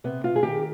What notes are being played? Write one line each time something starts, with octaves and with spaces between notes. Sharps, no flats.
C3 B3
F4
G#4
D#3 G4